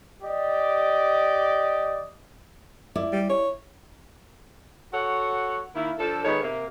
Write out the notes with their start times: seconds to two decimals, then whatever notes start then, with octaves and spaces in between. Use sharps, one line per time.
0.23 G4 D5 D#5
2.96 E4 D5
3.13 G3
3.29 C#5
4.92 F#4 A4 C#5 F#5
5.75 D#3 A#3 E4
5.99 F3 D4 A4
6.25 D#3 G#3 B3 A4 C#5
6.43 C3 A#3